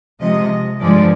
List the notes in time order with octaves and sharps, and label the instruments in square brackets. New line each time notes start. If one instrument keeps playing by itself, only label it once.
[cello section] C3 F3 G#3 D#5
G2 D3 F3 G#3 D5